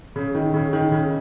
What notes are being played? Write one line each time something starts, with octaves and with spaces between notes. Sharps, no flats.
C#3
D#3
C#3
D#3
C#3